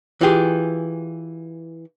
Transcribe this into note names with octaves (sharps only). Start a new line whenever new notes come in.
E3 F4 G4 G#4